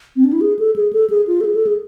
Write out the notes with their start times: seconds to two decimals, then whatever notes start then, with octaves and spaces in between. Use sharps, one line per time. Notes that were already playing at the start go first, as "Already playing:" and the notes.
0.16 C4
0.24 D4
0.33 E4
0.41 G#4
0.59 A4
0.76 G#4
0.93 A4
1.10 G#4
1.27 F4
1.41 A4
1.45 G#4
1.55 A4
1.67 G#4